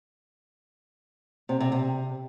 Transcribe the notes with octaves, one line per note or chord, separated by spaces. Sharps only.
C3
C3
C3